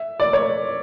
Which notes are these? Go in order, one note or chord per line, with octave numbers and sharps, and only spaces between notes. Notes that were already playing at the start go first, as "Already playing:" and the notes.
Already playing: E5
D5
C#5